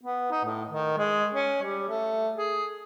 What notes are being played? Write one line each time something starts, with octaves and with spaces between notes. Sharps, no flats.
B3
D#4
A2
D#3
G#3
C#4
G3
A3
G#4